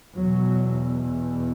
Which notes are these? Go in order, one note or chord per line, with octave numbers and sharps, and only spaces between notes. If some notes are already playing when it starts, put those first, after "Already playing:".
E2 B2 F#3